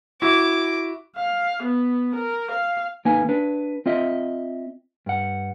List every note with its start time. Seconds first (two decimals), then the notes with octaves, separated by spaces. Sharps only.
0.22 E4 F#4 D6
1.17 F5
1.64 B3
2.16 A#4
2.52 F5
3.05 D#2 A#3 D#4 B4 G#5
3.29 D4 B4
3.86 C4 F4 D#5 E5
5.06 G2 F#5